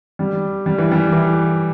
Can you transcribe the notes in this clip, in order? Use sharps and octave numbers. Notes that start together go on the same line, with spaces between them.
G3
G3
E3
G3
E3